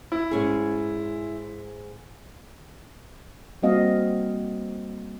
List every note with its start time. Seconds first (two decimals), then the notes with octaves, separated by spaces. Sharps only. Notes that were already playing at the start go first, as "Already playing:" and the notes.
0.12 E4
0.31 G#2 C#4 G#4
3.63 G3 A#3 C4 F#4 D#5 F5